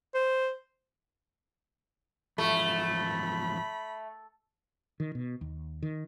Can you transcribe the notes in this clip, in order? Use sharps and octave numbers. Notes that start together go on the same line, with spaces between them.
C5
E2 G#2 F3 A3 B5
D#3
B2
D#2
D#3